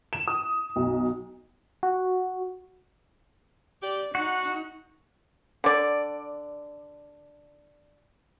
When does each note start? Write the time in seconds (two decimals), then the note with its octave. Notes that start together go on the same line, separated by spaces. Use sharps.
0.13 E7
0.28 D#6
0.76 B1
1.83 F#4
3.83 G4 D5
4.15 D#4 F#4 F#5
5.64 D3 D5